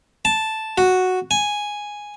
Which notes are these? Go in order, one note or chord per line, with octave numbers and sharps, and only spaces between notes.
A5
F#4
G#5